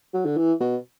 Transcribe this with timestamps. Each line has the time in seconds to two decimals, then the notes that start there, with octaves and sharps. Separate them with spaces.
0.14 F#3
0.26 D3
0.37 E3
0.60 B2